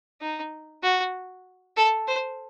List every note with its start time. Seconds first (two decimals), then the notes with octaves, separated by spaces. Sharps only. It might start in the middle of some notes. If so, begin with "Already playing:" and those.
0.21 D#4
0.83 F#4
1.77 A4
2.08 C5